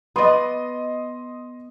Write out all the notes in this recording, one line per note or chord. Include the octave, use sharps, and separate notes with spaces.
B3 D5 D#5 C6